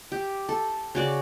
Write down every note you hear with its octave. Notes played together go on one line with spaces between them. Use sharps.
G4
A4
C#3 F#4 D5